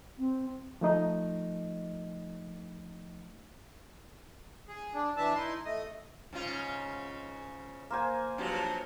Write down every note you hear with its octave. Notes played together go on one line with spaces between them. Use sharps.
C4
F3 A3 D#4 D#5
G#4
D4
E3 D4 E5 A5
D#4 E4 C6
A3 D#5
G#2 C#3 F4
A#3 C5 G#5
G2 F3 F#3